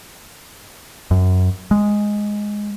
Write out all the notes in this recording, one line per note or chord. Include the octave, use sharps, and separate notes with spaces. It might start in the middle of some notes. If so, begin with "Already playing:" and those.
F#2
G#3